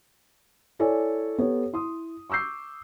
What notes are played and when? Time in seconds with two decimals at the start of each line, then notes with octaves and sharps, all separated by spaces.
0.79 E4 A4 C#5 D5 G#5
1.38 B3 G4 A4 C#5
1.73 E4 C6 D#6
2.30 C#6 D6 E6 G6 C7